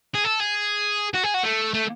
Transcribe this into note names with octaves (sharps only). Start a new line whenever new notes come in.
G#4
A4
G#4
F#4
G#4
F#4
A3
A3